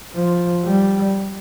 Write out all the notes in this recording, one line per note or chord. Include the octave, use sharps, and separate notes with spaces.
F3
G3